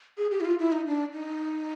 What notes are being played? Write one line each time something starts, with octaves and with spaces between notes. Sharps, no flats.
G#4
G4
E4
F4
E4
D#4
D4
D#4